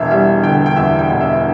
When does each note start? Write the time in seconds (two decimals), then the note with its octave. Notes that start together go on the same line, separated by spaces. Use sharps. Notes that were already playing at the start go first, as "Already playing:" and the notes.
Already playing: E1 E2 E5
0.11 G3 E5
0.43 D3 G5
0.66 G5
0.76 E2 E5
0.99 G5
1.10 E1
1.21 E5